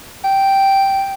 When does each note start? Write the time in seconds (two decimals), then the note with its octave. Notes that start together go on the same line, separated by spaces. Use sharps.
0.24 G5